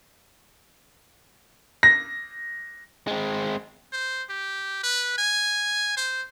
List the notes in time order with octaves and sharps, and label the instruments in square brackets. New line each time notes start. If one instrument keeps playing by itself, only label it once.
[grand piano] A#6
[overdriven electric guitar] G#3 C4
[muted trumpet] C5
G4
B4
G#5
C5